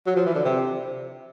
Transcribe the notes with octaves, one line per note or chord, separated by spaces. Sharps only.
F#3
F3
E3
D3
C3